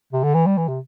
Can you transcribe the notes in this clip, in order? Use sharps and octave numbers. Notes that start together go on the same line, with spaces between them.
C3
D3
E3
G3
E3
C3